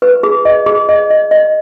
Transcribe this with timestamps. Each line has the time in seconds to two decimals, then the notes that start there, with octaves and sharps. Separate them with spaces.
0.02 B4
0.23 G#4
0.45 D#5
0.66 G#4
0.89 D#5
1.10 D#5
1.31 D#5